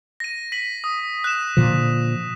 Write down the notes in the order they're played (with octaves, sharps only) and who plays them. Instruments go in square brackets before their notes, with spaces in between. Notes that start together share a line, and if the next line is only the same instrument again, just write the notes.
[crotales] A#6 D#7
B6 D#7 F#7
D#6
F#6 E7
[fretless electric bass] A#2 D3 F3